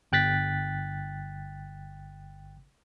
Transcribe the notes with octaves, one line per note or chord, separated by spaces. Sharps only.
G1 G5 F#6 A6 B6